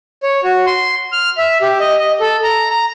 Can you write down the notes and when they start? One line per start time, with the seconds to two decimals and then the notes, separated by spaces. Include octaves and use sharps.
0.23 C#5
0.44 F#4
0.67 C6
1.12 F6
1.38 E5
1.62 G4
1.80 D#5
1.99 D#5
2.20 A4
2.44 A#5
2.71 A#5